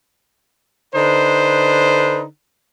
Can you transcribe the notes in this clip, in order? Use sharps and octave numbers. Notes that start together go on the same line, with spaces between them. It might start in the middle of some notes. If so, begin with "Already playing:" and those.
D3 D#4 B4 C5